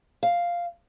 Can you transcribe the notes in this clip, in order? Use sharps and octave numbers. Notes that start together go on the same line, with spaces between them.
F5